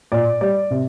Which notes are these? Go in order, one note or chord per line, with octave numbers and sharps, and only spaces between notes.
A#2 D5
G3 D5
C3